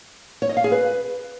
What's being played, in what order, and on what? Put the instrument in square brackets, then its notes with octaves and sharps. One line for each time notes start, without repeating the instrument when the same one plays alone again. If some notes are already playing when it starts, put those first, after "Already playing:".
[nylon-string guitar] C#5
D#5
F5
G#4
B4